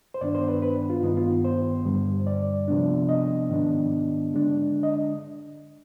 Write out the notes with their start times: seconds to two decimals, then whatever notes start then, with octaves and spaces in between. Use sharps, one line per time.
0.14 C5
0.21 G2 D#3 B3 D4 D5
0.35 C5
0.49 B4
0.62 B4
0.90 F4
1.03 G2 D#3 B3 D#4
1.17 F4
1.45 C5
1.86 G2 D3 G3
2.27 D5
2.68 C3 F3 B3 D4
3.09 D#5
3.50 G#2 D#3 B3 D4
4.32 D3 G#3 D4
4.83 D#5